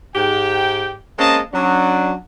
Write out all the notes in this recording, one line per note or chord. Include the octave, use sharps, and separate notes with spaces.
G#2 G4 G5
G#3 A#3 C4 C#4 D#5 A5
F#3 C#4 D4